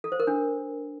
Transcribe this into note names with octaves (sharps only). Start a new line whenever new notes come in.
A4
C5
A#4
D4